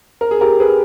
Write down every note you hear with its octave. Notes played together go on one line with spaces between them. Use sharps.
A#4
G#4
G4 A#4
G#4 B4